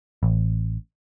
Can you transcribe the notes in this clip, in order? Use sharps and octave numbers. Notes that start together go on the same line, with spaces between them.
A1